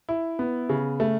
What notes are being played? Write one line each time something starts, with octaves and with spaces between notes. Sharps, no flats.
E4
B3
C#3
A3